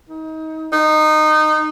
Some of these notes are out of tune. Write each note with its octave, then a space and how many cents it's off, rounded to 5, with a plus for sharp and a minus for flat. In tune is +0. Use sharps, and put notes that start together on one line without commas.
D#4 +30
D#4 -20